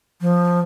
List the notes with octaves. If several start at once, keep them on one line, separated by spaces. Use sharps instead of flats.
F3